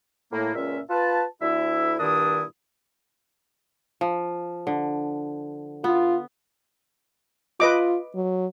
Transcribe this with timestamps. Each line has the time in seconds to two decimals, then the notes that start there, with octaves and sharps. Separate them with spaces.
0.33 A2 A#3
0.55 C#2 A#2 C#4 E5
0.90 F4 B4 A5
1.42 D2 E4 E5
2.00 G2 A#2 D#3 D4 E4 D#6
4.01 F3
4.67 D3
5.84 B3 F4
7.60 F4 B4 D#5 D6
8.15 F#3